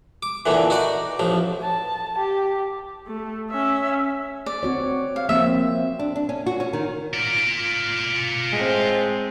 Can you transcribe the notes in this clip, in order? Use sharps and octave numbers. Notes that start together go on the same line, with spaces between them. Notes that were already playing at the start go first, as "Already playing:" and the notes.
D6
A#2 D3 E3
D#4 F#4 D5
A1 F3
A5
G4
A3
C#4 E5
D5
C4 F#4 C#5
F5
F3 A#3 C4 E5
D4
D4
C#4
F#4
C#4
D#3
F4 D5
A2 G#3 C4